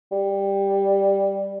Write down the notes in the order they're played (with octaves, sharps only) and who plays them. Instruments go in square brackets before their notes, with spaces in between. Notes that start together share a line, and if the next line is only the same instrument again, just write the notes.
[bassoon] G3